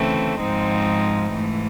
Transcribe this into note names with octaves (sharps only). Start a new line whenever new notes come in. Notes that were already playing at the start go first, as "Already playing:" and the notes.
Already playing: D2 C#3 E3 A3 C4
G#2 F3 G#3 C4 D#4
G#2 E3 A3